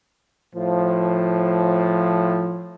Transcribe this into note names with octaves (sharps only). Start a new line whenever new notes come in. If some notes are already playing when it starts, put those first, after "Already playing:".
A2 F3